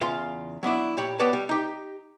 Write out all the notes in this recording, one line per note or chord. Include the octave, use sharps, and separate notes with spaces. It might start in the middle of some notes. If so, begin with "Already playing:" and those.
E2 C#3 F4 F5 C6
F#3 B3 D4 E4
A#2 G4 C#5 B5
B3 G4 B4 C#5 D5 A5
G3
D#4 G4